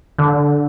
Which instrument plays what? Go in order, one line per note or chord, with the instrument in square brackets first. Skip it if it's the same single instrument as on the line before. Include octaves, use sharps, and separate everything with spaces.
[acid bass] D3